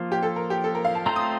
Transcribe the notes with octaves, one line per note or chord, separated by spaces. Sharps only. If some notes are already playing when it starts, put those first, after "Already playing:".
Already playing: F3 A#3 F4
G4
A4
A#4
G4
A4
A#4
F5
A5
A3 C4 F4 C5 A#5
D#6